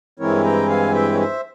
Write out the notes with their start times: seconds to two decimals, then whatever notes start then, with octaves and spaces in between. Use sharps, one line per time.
0.19 G2 E3 G#3 C4 E4 A#4 C#5
0.44 G5 A#5
0.69 F5 G#5
0.94 E5 G5
1.13 C#5
1.19 C5 E5